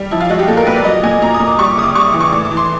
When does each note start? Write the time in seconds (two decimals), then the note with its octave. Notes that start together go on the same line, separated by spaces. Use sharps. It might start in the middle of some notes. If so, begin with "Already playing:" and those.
Already playing: G3
0.11 F3 E4
0.20 F4
0.30 G#3 F#4
0.39 G4
0.48 A#2 A4
0.57 A#4
0.67 A#2 B4
0.76 D5
0.85 F#3 D#5
1.03 A#2 G#5
1.22 A#2 A#5
1.34 D#6
1.40 A#2
1.47 D6
1.59 G3 C#6
1.71 D6
1.77 C#3 D#6
1.83 D6
1.95 G3 C#6
2.08 D6
2.14 E3
2.20 C#6
2.32 A2 D6
2.45 D6
2.51 E3
2.57 C6